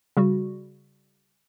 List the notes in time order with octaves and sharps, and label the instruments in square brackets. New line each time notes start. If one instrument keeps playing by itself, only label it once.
[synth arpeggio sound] C#3 G3 F#4